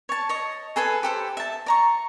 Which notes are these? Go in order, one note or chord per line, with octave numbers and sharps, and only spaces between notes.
C#5 A5
C#5 D#5
G#4 A4 B4 G#5
G4 A4 C5
E5 A5
D5 A#5 C#6